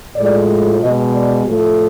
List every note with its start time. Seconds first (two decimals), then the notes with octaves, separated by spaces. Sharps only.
0.16 A2 F3 G#3 D5
0.81 B2 G#3 D#5
1.14 D5
1.46 A2 F3 A3